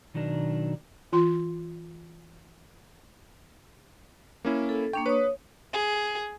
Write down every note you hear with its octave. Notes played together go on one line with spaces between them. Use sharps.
B2 D#3 F#3 D4 A#4
E3 F4 C6
A#3 C#4 E4
A4
A#3 D4 G5 C#6
B4 C#5 D#6
G#4